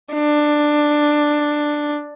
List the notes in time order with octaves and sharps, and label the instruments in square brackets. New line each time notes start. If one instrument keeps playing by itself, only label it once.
[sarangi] D4